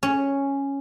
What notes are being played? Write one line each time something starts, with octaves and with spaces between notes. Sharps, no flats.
C#4